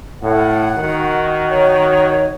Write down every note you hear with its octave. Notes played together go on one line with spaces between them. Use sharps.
A2 F#5
D#3 F#4
C#5